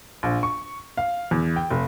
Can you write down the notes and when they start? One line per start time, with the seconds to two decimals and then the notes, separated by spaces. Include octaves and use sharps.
0.23 A#1
0.43 C#6
0.97 F5
1.31 E2
1.56 G5
1.70 F1